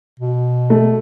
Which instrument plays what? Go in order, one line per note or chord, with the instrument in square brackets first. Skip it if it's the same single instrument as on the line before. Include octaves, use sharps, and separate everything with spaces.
[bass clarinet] B2
[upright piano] A3